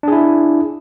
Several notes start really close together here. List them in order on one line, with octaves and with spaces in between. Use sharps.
D4 G#4 E4